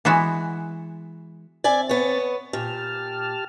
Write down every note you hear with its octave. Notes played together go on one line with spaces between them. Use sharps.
E3 G#3 B3 E4 F#4
C4 D5 E5 G#5 A6
B3 C#5
A#2 G4 A5 F6